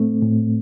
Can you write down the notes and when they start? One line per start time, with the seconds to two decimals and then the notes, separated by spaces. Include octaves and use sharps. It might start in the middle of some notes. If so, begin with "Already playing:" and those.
Already playing: A2 A3 C4
0.22 A2